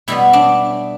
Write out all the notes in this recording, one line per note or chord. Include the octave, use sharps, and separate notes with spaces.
B2 G3 B3 E4
D4